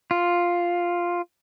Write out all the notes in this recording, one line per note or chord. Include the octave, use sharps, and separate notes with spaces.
F4